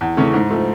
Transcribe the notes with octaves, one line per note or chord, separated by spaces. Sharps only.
E2
C#3 E3 A3 C#4
G#2
F3 A3